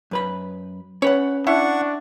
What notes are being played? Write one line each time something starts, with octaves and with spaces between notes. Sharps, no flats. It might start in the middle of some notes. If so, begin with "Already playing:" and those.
F#2 B4 B5
C#4 B4 C#5 F#5
D4 E4 F#5 C#6